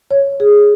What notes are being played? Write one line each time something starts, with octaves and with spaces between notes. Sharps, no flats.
C#5
G#4